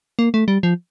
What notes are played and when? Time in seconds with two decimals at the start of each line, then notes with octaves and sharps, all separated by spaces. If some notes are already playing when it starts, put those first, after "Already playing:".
0.19 A#3
0.34 A3
0.48 G3
0.63 F3